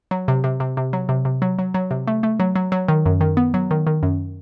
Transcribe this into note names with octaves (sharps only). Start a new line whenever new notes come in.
F#3
C3
C3
C3
C3
F#3
C3
C3
F#3
F#3
F#3
C3
A3
A3
F#3
F#3
F#3
D#3
F#2
D#3
B3
F#3
D#3
D#3
F#2